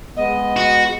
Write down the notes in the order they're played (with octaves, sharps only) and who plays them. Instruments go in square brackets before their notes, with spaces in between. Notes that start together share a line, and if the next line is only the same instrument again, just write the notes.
[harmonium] G#3 B3 [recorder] D#5
[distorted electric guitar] F#4